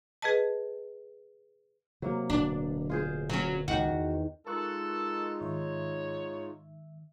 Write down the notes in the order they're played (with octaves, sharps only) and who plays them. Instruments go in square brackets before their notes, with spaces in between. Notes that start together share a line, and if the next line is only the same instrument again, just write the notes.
[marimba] G#4 B4 D#5 A5
[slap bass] C3 [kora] F#3 A#3
[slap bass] D1 B2 [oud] D4
[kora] F4 G#4 C5
[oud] F#3 C#4
[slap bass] C#2 A2 [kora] D#3 F#5 [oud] F#4
[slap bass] E2
[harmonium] G#3 D#4 F4 [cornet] A4 [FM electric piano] A#4 C#6 F#6
[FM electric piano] G#2 D#3 E5 [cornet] C#5